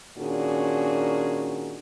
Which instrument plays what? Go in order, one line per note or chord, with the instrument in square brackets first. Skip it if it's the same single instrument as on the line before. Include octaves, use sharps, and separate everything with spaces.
[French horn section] A#2 D#3 C#4 D4 F#4 G#4